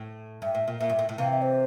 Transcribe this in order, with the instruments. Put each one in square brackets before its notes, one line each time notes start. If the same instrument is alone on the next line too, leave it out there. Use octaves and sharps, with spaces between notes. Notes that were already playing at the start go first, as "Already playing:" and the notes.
Already playing: [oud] A2
[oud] G2 [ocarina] E5
[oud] A2
A#2
[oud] A#2 [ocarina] E5
[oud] G2
A2
A2
[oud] C3 E3 [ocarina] F5
[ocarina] E5
C5